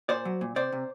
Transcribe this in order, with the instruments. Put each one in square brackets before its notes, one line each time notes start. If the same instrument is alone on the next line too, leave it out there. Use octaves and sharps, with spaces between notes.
[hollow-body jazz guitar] A#2 C5 D5
F#3
A#2
C3 C5 D5
C3